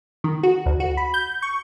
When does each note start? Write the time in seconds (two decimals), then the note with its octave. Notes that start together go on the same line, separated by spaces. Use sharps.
0.24 D#3
0.43 F#4
0.66 D2
0.80 F#4
0.97 B5
1.14 G6
1.42 C#6